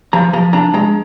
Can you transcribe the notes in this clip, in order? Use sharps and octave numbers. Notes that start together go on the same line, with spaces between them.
F3 A#5
F3 A#5
D4 A#5
G#3 A#5